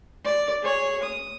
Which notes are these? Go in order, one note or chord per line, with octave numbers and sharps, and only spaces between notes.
D5
G#4 C#5
D#6